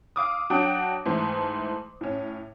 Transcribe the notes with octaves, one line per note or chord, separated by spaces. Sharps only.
F5 D6 D#6
F#3 D4 F#4 G5 D#6
G#2 E3 A3
A2 C#4